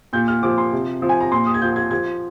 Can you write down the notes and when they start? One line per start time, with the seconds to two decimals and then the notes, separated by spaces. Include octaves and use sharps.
0.13 A#2 G6
0.28 F6
0.43 F3 D6
0.58 C6
0.73 C3
1.02 F3
1.09 G#5
1.20 A#5
1.32 A#2 C6
1.46 D#6
1.54 G#6
1.62 F3 G6
1.76 G#6
1.91 F3 G#6